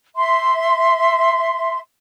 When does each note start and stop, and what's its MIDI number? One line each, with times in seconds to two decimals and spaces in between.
0.16 1.78 76
0.16 1.78 84